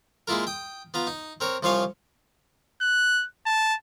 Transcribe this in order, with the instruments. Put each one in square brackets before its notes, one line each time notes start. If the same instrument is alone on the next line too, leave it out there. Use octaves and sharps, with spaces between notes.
[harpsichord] G#3 A#3 E4 F4 A#4
G5 D#6
B3 F4 A#5
D#4
C4 A#4 C#5
C2 F3 F4 C#5 F5 G#5
[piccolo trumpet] F#6
A5